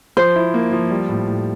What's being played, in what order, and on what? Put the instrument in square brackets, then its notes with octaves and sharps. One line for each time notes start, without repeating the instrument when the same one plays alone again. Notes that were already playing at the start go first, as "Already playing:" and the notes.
[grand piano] F3 [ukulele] C5
[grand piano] E4
A#3
F3
G3
A2
A2